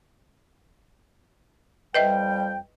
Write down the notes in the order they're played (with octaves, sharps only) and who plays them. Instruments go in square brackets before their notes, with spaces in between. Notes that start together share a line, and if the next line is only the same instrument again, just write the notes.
[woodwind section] F2 G3 G5 [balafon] B4 D#5 E5